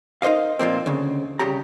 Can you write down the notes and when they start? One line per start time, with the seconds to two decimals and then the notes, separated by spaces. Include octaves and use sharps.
0.22 D#4 A#4 C5 D#5 F5
0.59 A#2 F3 A#3 C4
0.86 D2 C#3
1.39 C2 C#3 G4 A#5